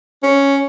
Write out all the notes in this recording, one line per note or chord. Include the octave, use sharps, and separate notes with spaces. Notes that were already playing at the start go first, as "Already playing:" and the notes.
C#4